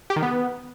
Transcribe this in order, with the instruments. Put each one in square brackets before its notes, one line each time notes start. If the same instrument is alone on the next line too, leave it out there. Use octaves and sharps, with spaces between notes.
[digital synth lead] G4
D#3
B3